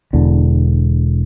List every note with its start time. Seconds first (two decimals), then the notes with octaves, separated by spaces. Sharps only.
0.13 E1 E2 D3